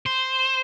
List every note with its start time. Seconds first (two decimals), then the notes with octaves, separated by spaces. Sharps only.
0.06 C5